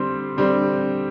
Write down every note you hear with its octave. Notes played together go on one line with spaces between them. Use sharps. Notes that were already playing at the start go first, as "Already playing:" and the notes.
Already playing: D3 G3 C4 C6
D3 G3 C4